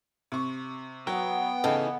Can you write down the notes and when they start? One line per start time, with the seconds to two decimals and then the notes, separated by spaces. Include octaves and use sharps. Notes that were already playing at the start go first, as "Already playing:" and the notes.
0.32 C3 C#6
1.07 F#3 B3 G5
1.64 C#3 E3 D#4 A4